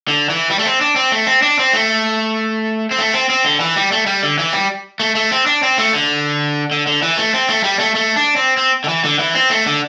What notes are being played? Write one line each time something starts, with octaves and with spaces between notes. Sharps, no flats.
D3
E3
G3
A3
C4
D4
C4
A3
C4
D4
C4
A3
C4
A3
C4
C4
D3
E3
G3
A3
G3
D3
E3
G3
A3
A3
C4
D4
C4
A3
D3
D3
D3
E3
A3
C4
A3
G3
A3
A3
D4
C4
C4
D3
E3
D3
E3
C4
A3
D3